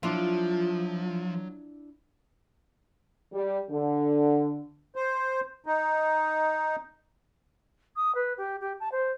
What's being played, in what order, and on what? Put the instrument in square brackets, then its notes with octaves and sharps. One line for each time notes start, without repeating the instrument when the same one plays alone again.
[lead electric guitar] F3 [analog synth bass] F#3 [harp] D4 E4 [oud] F4
[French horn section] G3
D3
[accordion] C5
D#4
[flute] D#6
B4
G4
G4
A5
C5